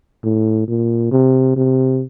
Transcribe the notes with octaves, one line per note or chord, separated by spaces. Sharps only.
A2
A#2
C3
C3